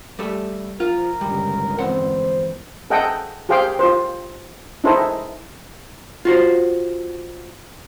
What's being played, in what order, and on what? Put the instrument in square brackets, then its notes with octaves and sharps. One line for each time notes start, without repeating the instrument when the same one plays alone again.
[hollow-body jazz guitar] G3 A3 A4
[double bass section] F3 [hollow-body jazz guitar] F4 [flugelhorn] A#4
[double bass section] G1 C#2 D#3 [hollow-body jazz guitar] G3
[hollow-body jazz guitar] E2 C4 F#5 [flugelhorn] C5
[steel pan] G#4 A4 D#5 F#5 G5
G4 G#4 C5 F5 G5
F4 C5
D#4 E4 G#4 A4 C5
[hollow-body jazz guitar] F4 F#4 C5